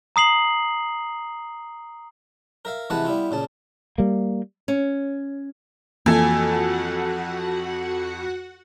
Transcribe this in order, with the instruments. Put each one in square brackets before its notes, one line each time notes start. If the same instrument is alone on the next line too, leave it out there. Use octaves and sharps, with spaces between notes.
[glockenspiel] A#5 D#6 C7 F#7
[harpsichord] A#4 E5 F5
C3 E3 G#3 B4 F#5 A5
G3 B3 E4 F4
A#2 C#3 A5
[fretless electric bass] G3 A#3
[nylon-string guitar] C#4
[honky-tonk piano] F2 A4 [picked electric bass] E3 A#3 [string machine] F#4 F#5 [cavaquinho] G#5